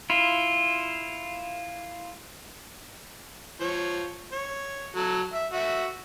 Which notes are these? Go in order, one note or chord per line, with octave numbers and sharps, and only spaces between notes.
E4 F4
F3 C#5
C#5
F#3 A4
E5
F#4 E5